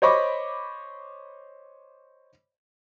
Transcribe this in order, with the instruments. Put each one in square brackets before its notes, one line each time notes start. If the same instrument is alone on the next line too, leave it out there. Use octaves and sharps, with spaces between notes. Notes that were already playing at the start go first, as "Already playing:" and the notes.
[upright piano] C5 C#5 D#5 B5 C#6 D6